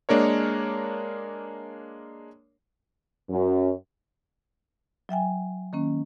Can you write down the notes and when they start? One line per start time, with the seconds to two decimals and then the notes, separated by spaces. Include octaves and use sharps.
0.09 G#3 A#3 D4 A#4 C#5
3.29 F#2
5.09 F#3 E5 G5 G#5
5.73 D#3 A#3 C#4